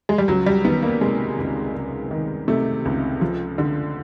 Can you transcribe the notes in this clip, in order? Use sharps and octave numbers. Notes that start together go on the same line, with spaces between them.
G#3
G3
C#2 F#3
G3
D#3 B3
A#3
C3 G#3
C#2
C#2
D#3
C3 A3
C#2
F3
D3